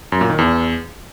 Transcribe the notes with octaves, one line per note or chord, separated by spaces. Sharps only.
F#2
A#2
D#3
E2